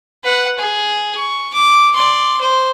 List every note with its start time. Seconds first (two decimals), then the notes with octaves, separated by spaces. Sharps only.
0.24 B4 F#5
0.58 G#4
1.16 C#6
1.53 D6
1.95 D5 C6
2.41 C5